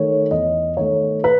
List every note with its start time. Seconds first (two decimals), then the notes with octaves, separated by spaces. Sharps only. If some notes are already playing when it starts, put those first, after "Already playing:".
Already playing: D#3 A3 C#5
0.31 E2 D#5
0.77 D#3 A3 C#5
1.24 B4